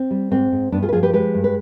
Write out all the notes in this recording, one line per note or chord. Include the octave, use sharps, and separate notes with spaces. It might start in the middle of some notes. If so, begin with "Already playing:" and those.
Already playing: C4
G3
G#2 C4
G#2
G2 B3 D4
F4 G#4
B4
F3 F4 G#4
G4 B4
G#3 G4 B4
G2
B4